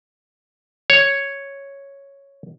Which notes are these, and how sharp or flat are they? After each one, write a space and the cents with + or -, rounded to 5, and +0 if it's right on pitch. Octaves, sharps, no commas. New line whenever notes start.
C#5 +0